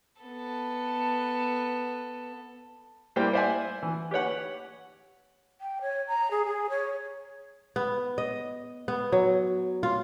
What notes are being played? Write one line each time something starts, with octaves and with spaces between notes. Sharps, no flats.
B3 A4
G3 A#3 E4 C5 G5
C5 D5 E5 F#5 G#5
E3
G4 B4 C#5 F#5
G5
C#5
A#5
G#4
G#4
C#5
B3
D#5
B3
F#3
F4